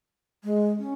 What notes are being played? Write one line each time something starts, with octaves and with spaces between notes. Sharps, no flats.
G#3
C#4